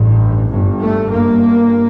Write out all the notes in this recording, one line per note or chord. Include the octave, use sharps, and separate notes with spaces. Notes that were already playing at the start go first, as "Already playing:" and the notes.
Already playing: A1 G2
G1 G2
A3
G1 G2 A#3